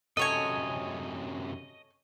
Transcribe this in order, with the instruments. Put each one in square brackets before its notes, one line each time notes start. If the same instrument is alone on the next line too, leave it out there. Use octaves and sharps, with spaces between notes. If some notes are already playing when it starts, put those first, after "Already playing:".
[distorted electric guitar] F#2 C3 [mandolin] A4 C#5 G#5 [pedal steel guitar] D#5